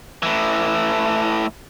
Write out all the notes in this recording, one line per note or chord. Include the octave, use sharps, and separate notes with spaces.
A2 E3